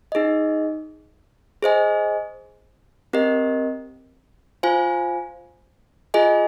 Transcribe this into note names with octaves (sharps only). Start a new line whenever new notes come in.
D#4 G#4 D#5
G#4 C5 D#5 G#5
C4 G4 A#4 D#5
F4 C5 F5 G#5
F4 G#4 D#5 G#5